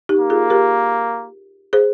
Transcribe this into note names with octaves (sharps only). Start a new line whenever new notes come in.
D#4 G4
A#3
F4 G#4
G4 A#4
G#4 C5